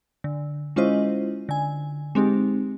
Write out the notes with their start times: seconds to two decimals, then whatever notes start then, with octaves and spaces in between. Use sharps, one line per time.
0.24 D3
0.76 G#3 C#4 E4 F4 C5 D#5
1.49 D3 G#5
2.15 G#3 C4 D#4 G4